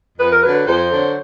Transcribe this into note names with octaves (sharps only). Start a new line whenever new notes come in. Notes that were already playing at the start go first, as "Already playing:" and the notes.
F2 B4
A#4
D3 F#3 B4
B4
F2 C5
D3 F#3